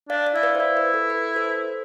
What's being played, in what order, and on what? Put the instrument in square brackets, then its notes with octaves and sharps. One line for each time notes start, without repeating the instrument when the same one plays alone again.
[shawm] D4 [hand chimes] D5 F5
[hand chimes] D5 F5
[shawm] E4 [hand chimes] E5
[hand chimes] B4 D5
C5
[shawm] E4 [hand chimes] B4
[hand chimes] B4
A4
B4
A4 C5